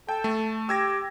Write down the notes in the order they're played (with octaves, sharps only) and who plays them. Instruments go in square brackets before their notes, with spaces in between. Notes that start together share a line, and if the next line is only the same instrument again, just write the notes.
[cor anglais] A4 [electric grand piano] G5
[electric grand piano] A3
[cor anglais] G4 [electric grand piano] E6 G#6 A#6